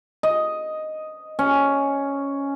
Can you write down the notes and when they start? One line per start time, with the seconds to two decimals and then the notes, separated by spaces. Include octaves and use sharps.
0.23 D#5
1.39 C#4